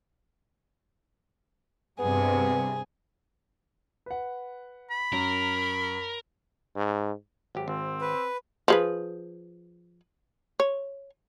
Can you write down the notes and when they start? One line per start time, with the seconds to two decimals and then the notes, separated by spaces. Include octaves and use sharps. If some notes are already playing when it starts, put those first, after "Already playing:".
1.99 G2 C3 B3 G#4
4.06 B4 F#5
4.91 B5
5.13 F#2 A#4
6.76 G#2
7.55 G#1 F#3 G4
7.68 G#1 C4
8.01 B4
8.68 F3 G#4 B4
10.60 C#5